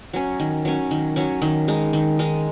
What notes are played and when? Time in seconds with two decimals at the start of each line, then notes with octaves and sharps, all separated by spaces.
0.13 F#3 C#4
0.40 D#3
0.65 F#3 C#4
0.91 D#3
1.16 F#3 C#4
1.42 D#3
1.68 G#3 D#4
1.93 D#3
2.19 G#3 D#4